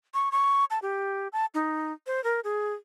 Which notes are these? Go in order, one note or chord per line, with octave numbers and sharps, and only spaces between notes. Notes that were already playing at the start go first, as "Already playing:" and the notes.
C#6
C#6
A5
G4
A5
D#4
C5
A#4
G#4